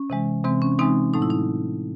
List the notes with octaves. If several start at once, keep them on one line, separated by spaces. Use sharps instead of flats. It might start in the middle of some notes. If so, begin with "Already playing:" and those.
Already playing: C#4
C3 E3 G#3
C3 E3 G#3 C4
C#4
C3 E3 G#3 C4 D#4
A2 F#3 A3 D#4
E4
D#4